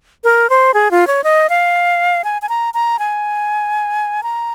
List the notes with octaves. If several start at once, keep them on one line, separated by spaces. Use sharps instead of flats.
A#4
C5
G#4
F4
C#5
D#5
F5
G#5
G#5
A#5
A#5
G#5
A#5